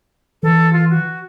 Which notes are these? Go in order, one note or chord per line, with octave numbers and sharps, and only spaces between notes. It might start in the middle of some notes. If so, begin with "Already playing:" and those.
E3 A4
F4
F#4